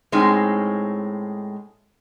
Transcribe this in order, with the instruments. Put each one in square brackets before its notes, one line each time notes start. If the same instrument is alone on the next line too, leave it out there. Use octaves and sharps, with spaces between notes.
[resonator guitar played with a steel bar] A2 G#3 C4 C#4 D#4